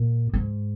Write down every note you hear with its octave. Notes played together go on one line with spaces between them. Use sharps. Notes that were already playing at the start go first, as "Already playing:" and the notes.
Already playing: A#2
G#2